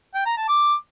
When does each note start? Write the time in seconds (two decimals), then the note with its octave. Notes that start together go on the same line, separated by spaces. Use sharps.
0.15 G5
0.26 A#5
0.37 A5
0.48 D6